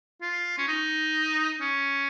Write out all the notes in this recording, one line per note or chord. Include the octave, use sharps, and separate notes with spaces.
F4
C#4
D#4
C#4